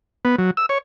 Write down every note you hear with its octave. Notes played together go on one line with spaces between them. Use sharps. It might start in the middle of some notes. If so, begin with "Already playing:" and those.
B3
F#3
E6
C#5